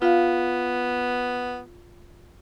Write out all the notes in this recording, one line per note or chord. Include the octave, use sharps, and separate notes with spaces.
B3 F4 F5